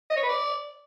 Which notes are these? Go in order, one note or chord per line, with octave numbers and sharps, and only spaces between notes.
D#5
C#5
B4
D5